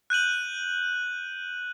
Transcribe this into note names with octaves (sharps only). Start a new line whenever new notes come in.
F#6 G6 D#7 F#7